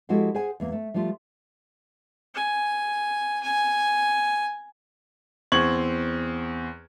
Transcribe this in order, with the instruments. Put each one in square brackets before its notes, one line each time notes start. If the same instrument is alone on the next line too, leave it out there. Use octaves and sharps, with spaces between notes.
[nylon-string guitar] F3 G#3 E4 F#4 G4 A4
G#4 C5 F#5 G#5
E2 A#3
A3
F3 G3 A3 F4
[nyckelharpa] G#5
G#5
[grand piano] E2 C4 C#6 G#6 F#7